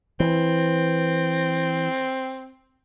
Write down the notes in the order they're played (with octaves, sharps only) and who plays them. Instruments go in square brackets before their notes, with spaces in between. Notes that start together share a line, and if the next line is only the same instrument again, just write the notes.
[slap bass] E3 [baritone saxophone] C4